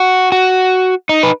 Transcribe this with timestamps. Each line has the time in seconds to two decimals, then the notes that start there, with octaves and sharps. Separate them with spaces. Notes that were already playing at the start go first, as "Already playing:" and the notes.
Already playing: F#4
0.32 F#4
1.09 D#4
1.23 B4